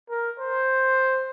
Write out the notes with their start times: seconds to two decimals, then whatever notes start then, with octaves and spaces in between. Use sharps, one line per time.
0.10 A#4
0.39 C5